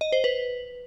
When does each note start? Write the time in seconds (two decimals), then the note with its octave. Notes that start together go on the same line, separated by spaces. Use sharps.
0.01 D#5
0.12 C5
0.24 B4